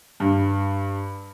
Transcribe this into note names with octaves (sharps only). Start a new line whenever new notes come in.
G2